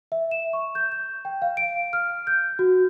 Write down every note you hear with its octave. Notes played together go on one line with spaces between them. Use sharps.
E5
E7
C#6
G6
G6
G5
F5
D7
F6
G6
F#4